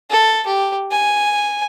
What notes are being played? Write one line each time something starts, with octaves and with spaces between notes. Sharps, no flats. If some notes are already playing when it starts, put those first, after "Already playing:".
A4
G4
G#5